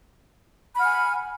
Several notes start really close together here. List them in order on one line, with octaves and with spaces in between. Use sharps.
B5 F#5 F6 G#5